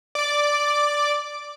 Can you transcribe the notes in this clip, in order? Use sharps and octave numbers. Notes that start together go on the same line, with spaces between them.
D5 D6